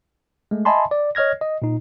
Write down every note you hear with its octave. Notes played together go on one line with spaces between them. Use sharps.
G#3 A3
D#5 E5 G#5 A5 B5 C6
D5
C#5 D#5 F6 G#6 A#6
D#5
A#2 D#4